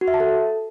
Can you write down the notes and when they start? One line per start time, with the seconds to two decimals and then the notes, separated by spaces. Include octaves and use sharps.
0.01 F#4
0.08 E5
0.14 A5
0.20 A4